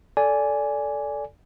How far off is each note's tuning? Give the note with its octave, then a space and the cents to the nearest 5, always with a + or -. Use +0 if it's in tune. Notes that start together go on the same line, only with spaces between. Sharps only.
A4 +0 D5 -15 G#5 +0